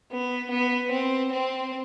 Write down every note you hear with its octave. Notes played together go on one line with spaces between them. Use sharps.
B3
B3
C4
C4